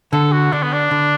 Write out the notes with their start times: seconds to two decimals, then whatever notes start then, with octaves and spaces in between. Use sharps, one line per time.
0.13 D3 A4
0.32 F#4
0.52 D3 D4
0.63 B3
0.73 D4
0.91 D3